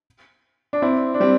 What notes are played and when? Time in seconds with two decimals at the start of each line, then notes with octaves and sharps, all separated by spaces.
0.73 D4
0.82 C4 E4
1.14 D4
1.20 G3 C4